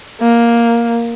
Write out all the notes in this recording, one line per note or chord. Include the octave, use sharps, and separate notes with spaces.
A#3